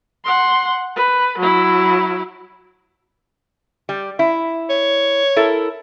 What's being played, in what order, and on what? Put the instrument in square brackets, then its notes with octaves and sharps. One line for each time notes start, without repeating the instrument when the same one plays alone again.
[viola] F#5 C6
B4
F#3 E4
[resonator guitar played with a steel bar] G3
E4
[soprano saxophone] C#5
[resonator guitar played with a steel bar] E4 A4 A#4